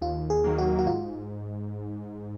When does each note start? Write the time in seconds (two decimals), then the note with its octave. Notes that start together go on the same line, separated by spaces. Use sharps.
0.01 D#2 F4
0.30 G#4
0.44 D#3 F#3 A#3
0.58 F#4
0.79 F#4
0.86 G#2 F4